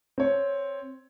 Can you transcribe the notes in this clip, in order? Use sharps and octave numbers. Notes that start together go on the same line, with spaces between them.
C4 C#5